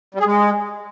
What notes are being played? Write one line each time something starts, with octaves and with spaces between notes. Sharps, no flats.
G3
G#4
G#3